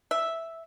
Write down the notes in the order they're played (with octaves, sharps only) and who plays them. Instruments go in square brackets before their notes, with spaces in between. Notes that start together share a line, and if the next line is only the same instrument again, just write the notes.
[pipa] E5